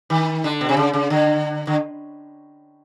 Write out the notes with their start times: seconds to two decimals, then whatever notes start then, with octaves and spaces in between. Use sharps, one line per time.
0.10 D#3
0.44 D3
0.61 B2
0.69 C3
0.77 C#3
0.94 C#3
1.10 D3
1.67 D3